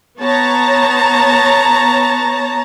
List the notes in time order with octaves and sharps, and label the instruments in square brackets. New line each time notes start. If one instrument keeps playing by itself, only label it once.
[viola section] B3 C#5 A5 A#5